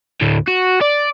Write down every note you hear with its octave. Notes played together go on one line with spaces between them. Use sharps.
D2 A2
F#4
D5